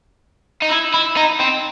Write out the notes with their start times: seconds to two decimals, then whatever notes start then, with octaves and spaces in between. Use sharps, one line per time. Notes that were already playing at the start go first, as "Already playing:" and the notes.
0.62 D#4
0.70 E4
0.94 E4
1.17 D#4
1.40 C4